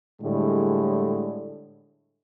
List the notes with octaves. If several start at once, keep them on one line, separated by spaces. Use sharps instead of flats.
A2 D3 G3 G#3